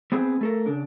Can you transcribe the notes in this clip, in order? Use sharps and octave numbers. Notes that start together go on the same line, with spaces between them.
B3 C4 G#4 B4 C5
A3 A4 A#4
C#3 D4